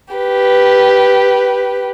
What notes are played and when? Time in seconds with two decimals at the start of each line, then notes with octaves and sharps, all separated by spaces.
0.14 G4 B4